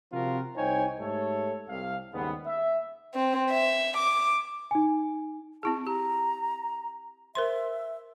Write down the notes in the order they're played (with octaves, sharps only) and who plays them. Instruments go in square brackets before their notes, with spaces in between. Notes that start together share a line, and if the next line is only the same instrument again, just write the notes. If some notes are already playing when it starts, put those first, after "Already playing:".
[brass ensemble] C3 F3 C4 F4 F#4 A#4
C2 D#4 C5 C#5 G5 G#5
G#2 A3 G4 A4 C#5
C2 F5
D#2 G#2 C#3 G3 B3
E5
[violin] C4
E5
D6
[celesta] D#4 G#5
[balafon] C4 E4 G#4 [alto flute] A5
[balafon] G4 [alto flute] A#5
[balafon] A#4 C5 C6 [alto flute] E5